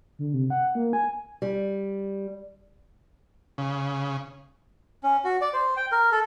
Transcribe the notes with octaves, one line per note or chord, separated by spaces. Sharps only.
D3
C3
F#5
A#3
G#5
G3
C#3
C#4
F#4
D5
C5
G5
A#4
A4